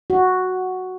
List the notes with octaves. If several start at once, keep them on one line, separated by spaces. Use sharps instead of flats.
F#4